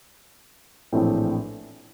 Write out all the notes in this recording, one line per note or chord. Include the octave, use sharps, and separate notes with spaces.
A#1 A2 E3 A3 C4